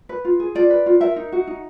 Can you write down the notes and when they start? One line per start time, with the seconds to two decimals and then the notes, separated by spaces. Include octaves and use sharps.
0.09 B4
0.25 F4
0.40 G#4
0.55 F4 D5
0.70 B4
0.86 F4
1.01 A#4 E5
1.16 D#4
1.32 F#4
1.47 D#4